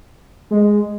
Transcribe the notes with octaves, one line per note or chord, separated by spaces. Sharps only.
G#3